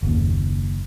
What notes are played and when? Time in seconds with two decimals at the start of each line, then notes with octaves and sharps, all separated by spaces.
0.03 F#1 D#2